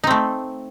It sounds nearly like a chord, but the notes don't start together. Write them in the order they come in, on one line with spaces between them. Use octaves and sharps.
D#4 C4 A3